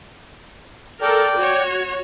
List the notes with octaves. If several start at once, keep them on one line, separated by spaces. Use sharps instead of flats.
A4 A#4 D5 G5
F#4 C#5